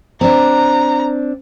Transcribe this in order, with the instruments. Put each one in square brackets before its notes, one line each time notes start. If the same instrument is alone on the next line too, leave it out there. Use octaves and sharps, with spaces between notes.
[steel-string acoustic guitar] C4 D4 [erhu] A#5